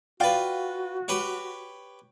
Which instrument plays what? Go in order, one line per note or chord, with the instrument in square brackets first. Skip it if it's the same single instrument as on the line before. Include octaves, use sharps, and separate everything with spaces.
[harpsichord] F4 B4 [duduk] F#4 [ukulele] D5 F5 G5
[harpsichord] G4 B4 C#5